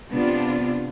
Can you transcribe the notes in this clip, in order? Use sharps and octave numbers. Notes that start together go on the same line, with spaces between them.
C3 B3 D4 F4